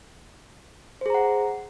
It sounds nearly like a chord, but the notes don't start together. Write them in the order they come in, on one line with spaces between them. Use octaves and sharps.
C5 G#4 A#5 F#5